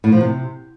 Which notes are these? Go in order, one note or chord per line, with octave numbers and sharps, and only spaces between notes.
A2
F3
C3